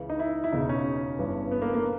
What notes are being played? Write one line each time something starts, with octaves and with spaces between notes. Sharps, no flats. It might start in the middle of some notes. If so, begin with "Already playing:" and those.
Already playing: C#2 C#3 E3
D#4
E4
E4
E1 E2 C#3 E3 D#4
C#4
G1 G2 E3
B3
A#3
A#3